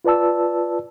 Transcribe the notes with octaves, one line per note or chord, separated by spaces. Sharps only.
F4 B4 D5 A5 E6